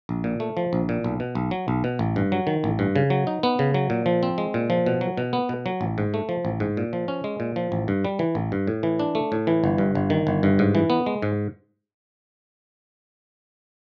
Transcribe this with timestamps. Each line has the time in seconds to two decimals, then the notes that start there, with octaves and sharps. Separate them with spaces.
0.09 A#1
0.24 A#2
0.40 A3
0.57 F3
0.73 A#1
0.89 A#2
1.04 B1
1.20 B2
1.35 B1
1.51 F#3
1.68 B1
1.84 B2
1.99 A1
2.16 G2
2.32 F#3
2.47 D#3
2.64 A1
2.79 G2
2.96 C#3
3.10 F#3
3.27 D#4
3.43 B3
3.59 C#3
3.74 F#3
3.90 A#2
4.06 F3
4.23 C4
4.38 G#3
4.54 A#2
4.70 F3
4.86 B2
5.01 F#3
5.17 B2
5.33 B3
5.49 B2
5.66 F#3
5.81 A1
5.98 G#2
6.14 A3
6.29 F3
6.45 A1
6.60 G#2
6.77 A#2
6.93 F3
7.08 C#4
7.24 G#3
7.40 A#2
7.56 F3
7.72 A1
7.88 G2
8.05 G3
8.19 E3
8.35 A1
8.52 G2
8.67 A2
8.83 E3
8.99 D4
9.15 A3
9.32 A2
9.47 E3
9.64 G1
9.78 G2
9.95 G1
10.10 D#3
10.27 G1
10.43 G2
10.59 G#2
10.75 E3
10.90 B3
11.06 G#3
11.22 G#2